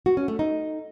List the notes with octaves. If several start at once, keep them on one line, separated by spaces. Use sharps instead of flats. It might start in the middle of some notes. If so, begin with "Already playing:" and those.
F#4
C#4
A3
D#4